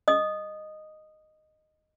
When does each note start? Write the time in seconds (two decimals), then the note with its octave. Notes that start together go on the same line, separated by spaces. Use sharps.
0.08 D#5 D#6